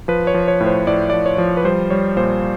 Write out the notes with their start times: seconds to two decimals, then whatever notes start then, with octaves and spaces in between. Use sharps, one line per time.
0.08 F3 B4
0.27 C#5
0.34 F3
0.48 C#5
0.60 A2
0.66 C5
0.87 A2 D5
1.10 F3 D5
1.26 C#5
1.38 F3
1.57 B4
1.64 G3 C5
1.90 G3 C#5
2.17 A#2 C5